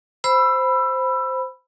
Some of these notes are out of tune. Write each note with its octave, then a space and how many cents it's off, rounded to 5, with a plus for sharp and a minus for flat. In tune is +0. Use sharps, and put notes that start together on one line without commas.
C5 +0 B5 +0 E6 +20